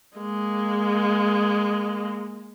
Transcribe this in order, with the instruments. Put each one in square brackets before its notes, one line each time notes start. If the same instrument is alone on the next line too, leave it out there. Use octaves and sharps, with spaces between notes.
[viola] G#3 A#3